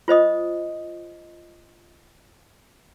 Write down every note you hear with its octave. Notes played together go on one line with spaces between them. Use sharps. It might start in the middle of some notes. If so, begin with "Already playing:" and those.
F4 C5 D#5 D#6